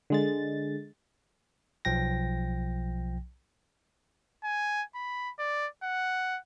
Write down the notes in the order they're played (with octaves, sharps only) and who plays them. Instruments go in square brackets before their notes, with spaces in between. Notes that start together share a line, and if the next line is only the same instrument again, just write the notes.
[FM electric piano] D3 G#3 A6
[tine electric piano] B1 F3 G5 A#6
[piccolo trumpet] G#5
B5
D5
F#5